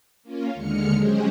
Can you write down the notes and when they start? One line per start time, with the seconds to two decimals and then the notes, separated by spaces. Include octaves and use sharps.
0.23 A#3 C#4 F4
0.54 D#2 D3 G#3 F6 C#7
0.95 F#3 G#3 C#4 G4 G#4 C5